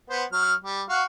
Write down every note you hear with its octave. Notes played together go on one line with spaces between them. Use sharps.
B3 C5
F#3 F6
G3
F#4 F5